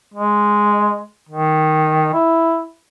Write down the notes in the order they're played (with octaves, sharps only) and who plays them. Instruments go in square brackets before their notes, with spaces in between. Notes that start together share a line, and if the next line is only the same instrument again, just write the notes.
[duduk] G#3
D#3
E4